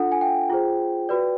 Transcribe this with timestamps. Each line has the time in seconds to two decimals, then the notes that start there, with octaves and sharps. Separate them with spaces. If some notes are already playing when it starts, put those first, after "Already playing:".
Already playing: D4 F4 A4 F#5
0.12 G#5
0.21 G5
0.50 F4 G#4 C5
1.09 F#4 B4 D5